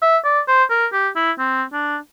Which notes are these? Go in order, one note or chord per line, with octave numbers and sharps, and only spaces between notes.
E5
D5
C5
A#4
G4
E4
C4
D4